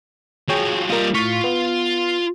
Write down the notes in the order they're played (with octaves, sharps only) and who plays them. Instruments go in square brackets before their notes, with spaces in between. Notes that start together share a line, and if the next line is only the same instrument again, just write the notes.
[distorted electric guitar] F3 F#3 [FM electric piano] G#4 C#5 G5
[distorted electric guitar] G3 D#5 [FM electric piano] A#3 F4
[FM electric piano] A2 C#6 B6 [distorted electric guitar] F4
[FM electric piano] B3